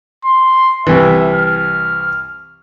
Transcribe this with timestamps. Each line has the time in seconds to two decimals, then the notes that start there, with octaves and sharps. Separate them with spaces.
0.25 C6
0.87 C2 E3 E5
1.34 F6